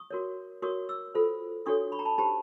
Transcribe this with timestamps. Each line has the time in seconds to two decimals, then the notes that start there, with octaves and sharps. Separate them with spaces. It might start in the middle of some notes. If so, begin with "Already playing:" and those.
Already playing: C#6 D#6
0.11 F#4 A#4 C#5
0.62 F#4 A#4 C#5 C#6 D#6
0.89 D6 E6
1.15 F4 A4 C5
1.66 D4 F#4 A4 C#5 C#6 D#6
1.92 B5 C#6
1.99 A#5
2.05 A5 B5
2.18 D#4 G4 C5 A5 B5